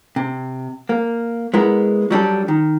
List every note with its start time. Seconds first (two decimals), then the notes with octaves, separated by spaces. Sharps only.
0.16 C3
0.89 A#3
1.54 G#3 B3 E4 A#4
2.10 F#3 G3 D4 A4
2.48 D#3